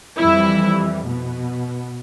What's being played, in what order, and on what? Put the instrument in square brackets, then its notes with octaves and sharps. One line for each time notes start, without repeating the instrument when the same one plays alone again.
[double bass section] F2 E3 G3 [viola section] E4
[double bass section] B2 B3